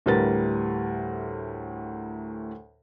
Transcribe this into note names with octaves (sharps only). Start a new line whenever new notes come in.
D2 A2 G3 A#4 B4 A6